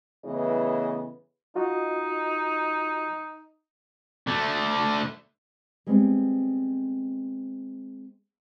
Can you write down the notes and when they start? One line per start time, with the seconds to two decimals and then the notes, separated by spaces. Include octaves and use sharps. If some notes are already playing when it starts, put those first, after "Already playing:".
0.24 A2 C#3 E3 B3 E4 D#5
1.56 D#4 F4 F#4 D#5
4.27 D3 A3
5.86 G3 G#3 B3 C4